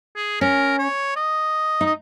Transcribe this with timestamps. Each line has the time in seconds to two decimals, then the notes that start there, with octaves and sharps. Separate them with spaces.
0.16 G#4
0.41 C#4 A#4
0.79 C#5
1.16 D#5
1.81 D#4
1.86 D#5